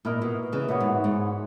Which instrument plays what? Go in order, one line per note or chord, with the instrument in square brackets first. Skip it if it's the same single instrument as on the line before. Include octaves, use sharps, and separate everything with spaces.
[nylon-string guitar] A#2 [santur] E4 A#4 D#5
[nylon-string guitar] B2
C#3 E3
[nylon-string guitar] A#2 [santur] B3 F#4 C#5 E5
[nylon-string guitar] G#2
G#2